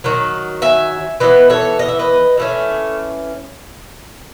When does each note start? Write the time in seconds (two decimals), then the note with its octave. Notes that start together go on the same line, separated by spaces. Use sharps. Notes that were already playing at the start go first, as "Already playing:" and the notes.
0.04 D#3 F#3
0.62 E5 G#5
1.20 E3 B3 B4 D#5
1.50 A4 C#5
1.79 D#5
1.88 E5
1.99 B4 D#5
2.37 E3 A3 C#4